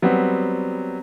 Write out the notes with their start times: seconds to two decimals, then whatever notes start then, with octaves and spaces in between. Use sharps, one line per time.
0.02 F#3 G3 B3 C4